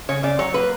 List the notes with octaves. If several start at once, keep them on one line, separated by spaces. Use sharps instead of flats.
C#3 C#5
C#3 D5
F#3 C#5
A#3 B4